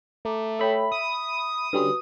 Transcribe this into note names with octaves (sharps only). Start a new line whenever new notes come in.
A3 A#5 D6
A4 C#5 E5 G5 B5
D#6 D#7
D3 G3 C#4 F#4 B4